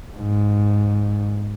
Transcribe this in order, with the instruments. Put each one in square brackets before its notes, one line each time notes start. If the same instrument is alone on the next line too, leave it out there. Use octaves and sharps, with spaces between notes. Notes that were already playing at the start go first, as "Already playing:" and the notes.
[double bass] G#2